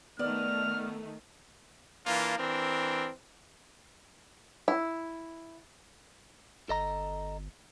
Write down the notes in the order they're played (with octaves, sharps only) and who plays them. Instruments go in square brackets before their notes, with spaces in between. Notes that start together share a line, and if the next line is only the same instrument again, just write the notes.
[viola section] D#3 A3 [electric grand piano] B3 [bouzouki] D5 F#5 [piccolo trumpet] F6
[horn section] E3 A#3 D4 F4
E3 C4 D4 A#4
[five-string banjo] E4
[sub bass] G1 [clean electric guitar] A4 D#5 A#5